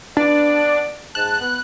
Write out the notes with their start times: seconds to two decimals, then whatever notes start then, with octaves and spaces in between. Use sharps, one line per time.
0.17 B3 D4 D5
1.15 G#2 A5 F#6
1.40 B3